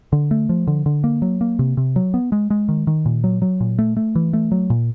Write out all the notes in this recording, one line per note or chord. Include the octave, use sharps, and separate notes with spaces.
D3
A3
F3
D3
D3
A#3
F#3
A#3
C3
C3
F#3
B3
G#3
G#3
D#3
D#3
A#2
F#3
F#3
A#2
A3
A3
E3
A3
F#3
A#2